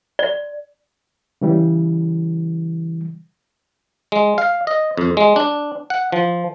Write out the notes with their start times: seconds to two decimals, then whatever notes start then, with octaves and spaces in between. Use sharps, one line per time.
0.19 D5
1.41 C#3 E3 G3
4.12 G#3
4.38 F5
4.67 D#5
4.97 F2
5.17 G#3
5.36 D4
5.90 F#5
6.12 F3